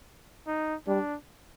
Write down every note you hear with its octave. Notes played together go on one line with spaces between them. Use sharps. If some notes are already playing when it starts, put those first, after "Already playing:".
D#4
G3 D4